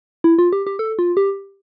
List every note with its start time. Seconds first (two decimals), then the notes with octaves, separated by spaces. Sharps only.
0.24 E4
0.39 F4
0.53 G4
0.67 G4
0.79 A4
0.99 F4
1.17 G4